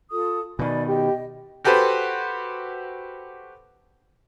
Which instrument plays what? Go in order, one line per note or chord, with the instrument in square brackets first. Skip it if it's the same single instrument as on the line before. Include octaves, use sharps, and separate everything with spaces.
[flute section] F4 A4 D#6
[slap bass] B2 D#3 [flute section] D5 G#5 B5
[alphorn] G4 [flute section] D#5
[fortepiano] F#4 G4 A4 B4 C5